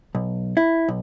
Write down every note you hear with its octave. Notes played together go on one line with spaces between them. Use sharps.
B1
E4
B1